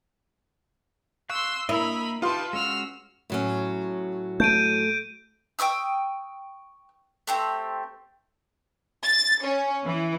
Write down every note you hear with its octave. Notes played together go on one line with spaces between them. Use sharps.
F5 C6 C#6 E6 F#6
A#3 E4 A#4 D#5 B5
D#4 F4 G4 B4 A5 C6
G#3 C#4 F#4 E6 F6
A2 F#3 C#4
A3 G6 D7 D#7
G5 C#6 D#6 E6
A3 C4 G4
A6
C#4
E3